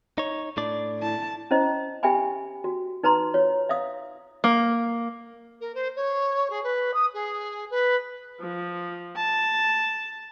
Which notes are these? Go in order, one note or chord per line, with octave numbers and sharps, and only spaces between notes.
D#4 C#5
A2 D4 D5
E4 A5
C#4 E4 C5 D#5
G4 E5 G5 G#5 B5
F#4
D#4 B4 A#5 C6
F4 C#5
E5 F5 D#6
A#3
A#4
C5
C#5
G#4
B4
D#6
G#4
B4
F3
A5